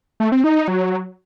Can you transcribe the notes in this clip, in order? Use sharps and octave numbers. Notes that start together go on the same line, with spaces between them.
A3
C4
D#4
D#4
F#3